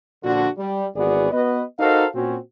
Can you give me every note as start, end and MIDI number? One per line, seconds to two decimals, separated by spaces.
0.23 0.47 46
0.23 0.47 50
0.23 0.47 53
0.23 0.47 62
0.23 0.47 66
0.57 0.85 55
0.95 1.31 32
0.95 1.31 52
0.95 1.31 59
0.95 1.31 66
0.95 1.31 68
0.95 1.31 74
1.32 1.62 59
1.32 1.62 66
1.32 1.62 71
1.32 1.62 75
1.80 2.05 63
1.80 2.05 66
1.80 2.05 69
1.80 2.05 70
1.80 2.05 72
1.80 2.05 77
2.15 2.37 46
2.15 2.37 60
2.15 2.37 61
2.15 2.37 66